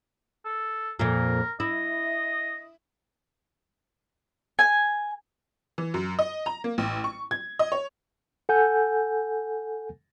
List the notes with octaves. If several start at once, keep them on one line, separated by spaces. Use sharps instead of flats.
A4
F2 A#2 A#4
E4 D#5
G#5
E3
F#2
D#5
A#5
A#3
A1
C#6
G#6
D#5
C#5
A4 F#5 G#5 G6